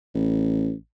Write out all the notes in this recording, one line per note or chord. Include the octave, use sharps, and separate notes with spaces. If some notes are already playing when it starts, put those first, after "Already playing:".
A1